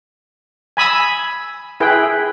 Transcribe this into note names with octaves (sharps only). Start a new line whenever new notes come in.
G#5 B5 D#6 E6
E4 G#4 B4 G5